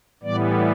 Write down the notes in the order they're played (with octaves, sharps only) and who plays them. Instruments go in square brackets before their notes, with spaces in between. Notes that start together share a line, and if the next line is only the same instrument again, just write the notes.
[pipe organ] A2 E3 G3 B3 D5